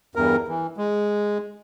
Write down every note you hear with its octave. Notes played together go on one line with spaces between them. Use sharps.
E2 G2 A#4
E3
G#3